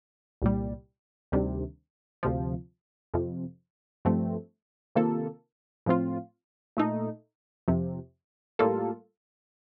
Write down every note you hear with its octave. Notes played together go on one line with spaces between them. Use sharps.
C2 A#2 G3
D2 C3 D#3 G3 D4
D2 C3 F3
F2 C3 F3
G2 F3 A3 C4
C3 D#3 A#3 F4 A4
A2 F3 C4 F4
A#2 A3 D#4 A4
F2 C3 F3
A2 G3 A#3 F4 A4